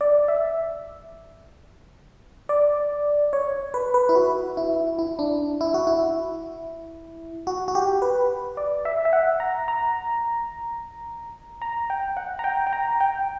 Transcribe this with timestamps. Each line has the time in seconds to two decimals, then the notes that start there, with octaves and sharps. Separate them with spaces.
0.01 D5
0.28 E5
2.49 D5
3.33 C#5
3.74 B4
3.94 B4
4.09 E4
4.15 F#4
4.57 E4
4.99 E4
5.19 D4
5.61 E4
5.74 F#4
5.87 E4
7.47 F#4
7.68 F#4
7.75 G4
8.02 B4
8.57 D5
8.85 E5
9.05 E5
9.13 F#5
9.40 A#5
9.68 A#5
11.62 A#5
11.90 G5
12.17 F#5
12.39 A#5
12.44 G5
12.67 G5
12.73 A#5
13.00 G5